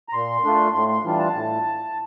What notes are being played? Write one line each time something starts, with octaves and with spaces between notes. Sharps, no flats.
A#5
A#2 C6
A3 D4 F4
A2 C6
C6
E3 G3 D4 F4
A5
A2